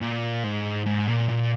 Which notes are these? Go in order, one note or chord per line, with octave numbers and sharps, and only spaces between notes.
A#2
G#2
G#2
A#2
A#2